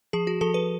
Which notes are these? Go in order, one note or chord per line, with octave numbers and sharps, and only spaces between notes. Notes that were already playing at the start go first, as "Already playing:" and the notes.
F3 G#4
F#4
F3 A4
B4